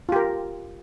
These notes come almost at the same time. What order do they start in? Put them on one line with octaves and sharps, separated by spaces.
F4 G4 A#4